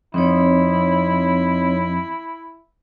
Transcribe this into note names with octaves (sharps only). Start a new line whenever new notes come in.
F2 C4 D#4 E4 C#5